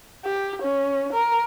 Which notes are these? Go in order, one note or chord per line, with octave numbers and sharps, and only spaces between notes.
G4
C#4
A#4